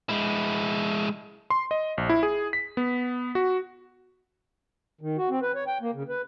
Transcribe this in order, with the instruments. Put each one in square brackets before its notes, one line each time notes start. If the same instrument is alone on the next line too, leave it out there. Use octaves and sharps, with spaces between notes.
[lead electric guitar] G#3 E4
[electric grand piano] C6
D#5
A#1
E4
G#4
B6
B3
F#4
[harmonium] D#3
F#4
C4
B4
C#5
G5
A#3
C#3
B4